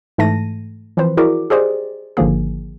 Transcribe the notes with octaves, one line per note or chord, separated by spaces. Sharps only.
G#2 E3 A3 A5 A#6 D#7
E3 F3 C4 B4 C5
E4 F#4 G#4 A#4 D5 D6
G4 G#4 C5 D5 D#5
G#1 D3 D#3 F3 A#3 G#4